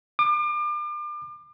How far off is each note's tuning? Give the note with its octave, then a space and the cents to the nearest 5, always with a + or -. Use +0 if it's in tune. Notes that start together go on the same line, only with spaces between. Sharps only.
D6 +35